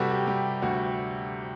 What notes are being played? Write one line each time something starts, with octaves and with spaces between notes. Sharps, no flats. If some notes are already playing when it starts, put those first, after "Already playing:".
Already playing: C3 G3 F#4 G4 A4 B4
G4
G3 G4
D2 F#4